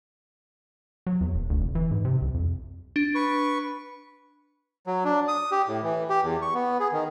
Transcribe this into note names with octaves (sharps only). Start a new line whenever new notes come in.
F#3
E2
E1
D2
F1
E3
G#2
C3
C2
F2
D4
B4 C#6
F#3
D4
D#6
G4
A2
E3
G4
E2
C#6
B3
G#4
D#3